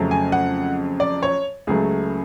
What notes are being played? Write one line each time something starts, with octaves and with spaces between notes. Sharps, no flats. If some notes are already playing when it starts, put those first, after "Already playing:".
Already playing: F2 C#3 F#3 A3
G#5
F#5
D5
C#5
C#2 C#3 F#3 A3 G#4